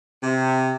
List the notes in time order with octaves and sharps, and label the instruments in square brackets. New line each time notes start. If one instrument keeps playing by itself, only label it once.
[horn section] C3